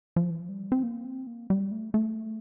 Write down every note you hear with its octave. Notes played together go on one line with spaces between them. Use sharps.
F3
E3
F3
G3
C4
A#3
C4
A#3
G3
A3
A3